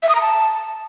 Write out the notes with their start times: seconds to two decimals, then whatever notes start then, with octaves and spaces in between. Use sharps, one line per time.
0.03 E5
0.09 D#6
0.15 A#5
0.21 A5